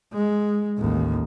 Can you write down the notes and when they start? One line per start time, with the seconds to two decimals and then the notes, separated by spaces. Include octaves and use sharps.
0.13 G#3
0.79 A1 D#2